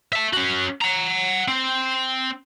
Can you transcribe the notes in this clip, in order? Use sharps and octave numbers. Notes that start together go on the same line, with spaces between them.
E5 A5
C#4 F#4
F#5 A#5
C4